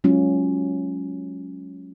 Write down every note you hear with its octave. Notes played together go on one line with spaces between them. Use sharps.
F#3 G#3 C#4 F4